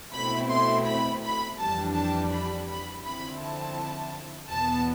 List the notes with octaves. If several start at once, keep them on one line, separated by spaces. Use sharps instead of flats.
B2 A3 C4 E4 B5
C6
B5
B5
F2 E3 G3 D4 A5
A5
B5
B5
D3 F3 C4 E4 B5
A5
E2 B2 B3 A5